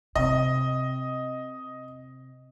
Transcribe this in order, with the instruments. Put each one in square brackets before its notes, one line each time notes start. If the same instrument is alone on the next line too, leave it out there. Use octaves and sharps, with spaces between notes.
[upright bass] C3 [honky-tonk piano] D#5